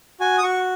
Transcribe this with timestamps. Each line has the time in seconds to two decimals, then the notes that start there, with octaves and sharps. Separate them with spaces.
0.20 F#4 G#5
0.38 D#6
0.43 F#4 C#6